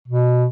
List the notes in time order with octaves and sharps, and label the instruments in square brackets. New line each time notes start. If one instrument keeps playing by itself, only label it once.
[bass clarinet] B2